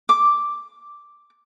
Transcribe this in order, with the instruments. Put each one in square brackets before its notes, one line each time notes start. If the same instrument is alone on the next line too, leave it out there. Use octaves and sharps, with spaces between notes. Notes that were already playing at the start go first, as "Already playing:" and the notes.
[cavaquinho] D6